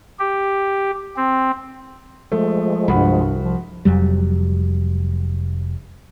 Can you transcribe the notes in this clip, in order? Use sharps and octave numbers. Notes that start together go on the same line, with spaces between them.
G4
C4
F3 G#3 A3
C2 G2 F#4 B5
F3
F1 F2 F#3 G3